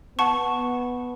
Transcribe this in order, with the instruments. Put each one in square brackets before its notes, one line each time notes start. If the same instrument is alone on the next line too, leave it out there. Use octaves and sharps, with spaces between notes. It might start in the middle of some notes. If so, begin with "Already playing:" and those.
[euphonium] B3 [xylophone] F#5 A5 C#6